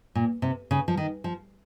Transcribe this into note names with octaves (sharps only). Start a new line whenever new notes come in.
A#2
C3
C#3
F3
D#3
F3